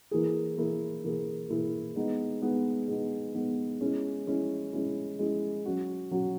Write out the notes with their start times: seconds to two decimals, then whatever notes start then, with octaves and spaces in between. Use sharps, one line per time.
0.11 E3 A#3 E4 G#4
0.57 E3 A#3 E4 G#4
1.04 E3 A#3 E4 G#4
1.49 E3 A#3 E4 G#4
1.96 G#3 B3 D#4
2.42 G#3 B3 D#4
2.88 G#3 B3 D#4
3.34 G#3 B3 D#4
3.81 G#3 C#4 E4
4.27 G#3 C#4 E4
4.73 G#3 C#4 E4
5.19 G#3 C#4 E4
5.66 F#3 C#4 F#4
6.11 F#3 C#4 F#4